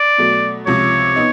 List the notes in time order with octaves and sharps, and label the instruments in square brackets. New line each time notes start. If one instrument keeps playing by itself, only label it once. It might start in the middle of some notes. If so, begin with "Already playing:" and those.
Already playing: [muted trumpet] D5
[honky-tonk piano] B2 F#3 A3
[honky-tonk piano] C#2 C3 F3 [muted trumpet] C#5
[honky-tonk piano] B3 D#4